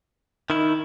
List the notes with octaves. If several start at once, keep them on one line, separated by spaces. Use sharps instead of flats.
D#3 D#4 E4